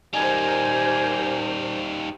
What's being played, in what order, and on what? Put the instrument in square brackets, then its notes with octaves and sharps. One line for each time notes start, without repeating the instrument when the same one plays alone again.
[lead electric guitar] G3 D#4 [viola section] G4 A#4 C5 [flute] G#5